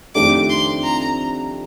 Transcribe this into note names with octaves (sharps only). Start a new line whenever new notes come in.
F2 D#3 A3 D4 G4 D6
C6
A#5